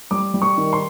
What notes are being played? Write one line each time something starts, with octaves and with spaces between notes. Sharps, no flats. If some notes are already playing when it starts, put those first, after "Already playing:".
G3 D6
G3
C#6
D#3
C6